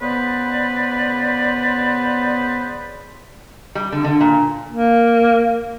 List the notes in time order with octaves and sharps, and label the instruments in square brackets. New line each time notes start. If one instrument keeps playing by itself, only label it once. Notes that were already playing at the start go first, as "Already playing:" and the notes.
[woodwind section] C#3 B3 B4 C5 D5
[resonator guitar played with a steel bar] G3
D3
D3
A#2
[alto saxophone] A#3